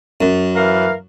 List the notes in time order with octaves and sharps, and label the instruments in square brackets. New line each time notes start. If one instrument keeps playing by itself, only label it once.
[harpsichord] F#2
[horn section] E3 A#4 F5